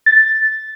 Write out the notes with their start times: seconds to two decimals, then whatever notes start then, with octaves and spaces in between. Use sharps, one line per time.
0.06 A6